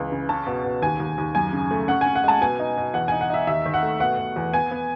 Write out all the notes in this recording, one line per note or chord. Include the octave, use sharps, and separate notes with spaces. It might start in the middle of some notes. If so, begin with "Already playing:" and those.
Already playing: C#2 E3
C#3
C#4 A5
B2
B2
D#2 G#5
D#2
D#2
F#2 G#5
C#3
A3
C#4 F#5
C#4 G#5
F#5
G#3 A5
B2 G#5
D#4
B2
E2 F#5
D#4 G#5
F#5
D#4 E5
D#2 E5
D#3
F#5
A3
B2 F#5
B2
E2
B3 G#5
B3